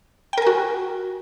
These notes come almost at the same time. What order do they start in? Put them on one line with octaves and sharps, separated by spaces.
G5 A#4 G#5 F#4